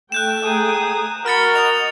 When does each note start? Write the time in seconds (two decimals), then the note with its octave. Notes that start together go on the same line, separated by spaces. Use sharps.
0.12 A3 G5 F#6 G6 E7
0.44 G#4 A#5 D#6
1.26 F#4 A#4 B5 F6 A6 C#7
1.55 D#5 F7